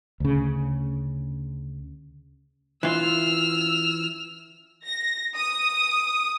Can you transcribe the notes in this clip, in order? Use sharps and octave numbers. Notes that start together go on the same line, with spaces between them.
D2 C#3
E3 F4 E6 F6
A#6
D#6